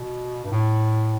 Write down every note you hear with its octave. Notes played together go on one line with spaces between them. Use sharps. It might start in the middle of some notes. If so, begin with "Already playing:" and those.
Already playing: B2
G2
A2